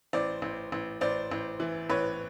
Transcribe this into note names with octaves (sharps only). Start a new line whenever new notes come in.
A1 C5 D5
A1
A1
A1 C5 D5
A1
E3
A1 B4 C#5